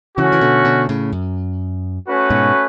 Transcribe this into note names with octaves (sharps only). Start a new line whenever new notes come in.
C#3 E3 A3 C#4 F#4
E3
B2 D3
B2 D3
A2 C#3
F#2
A3 C#4 F#4 B4
G#2 B2